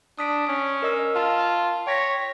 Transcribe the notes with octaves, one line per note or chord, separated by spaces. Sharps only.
D4 D#6 B6 D7
C#4
A#4 D#5 E6
F4 A5
C#5 G5 A#6 B6